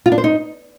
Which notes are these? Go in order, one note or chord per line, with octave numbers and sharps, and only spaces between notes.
F4
D4
C5
D#4